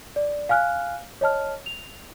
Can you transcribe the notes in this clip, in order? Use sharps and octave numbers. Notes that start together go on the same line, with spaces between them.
D5
F5 G#5 F6 F#6
C#5 D#5 A5 F6
F7